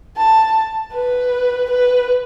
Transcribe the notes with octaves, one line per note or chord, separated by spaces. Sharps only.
A5
B4
B4